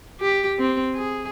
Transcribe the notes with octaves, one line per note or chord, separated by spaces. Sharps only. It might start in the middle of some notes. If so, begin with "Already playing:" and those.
G4
C4
G#4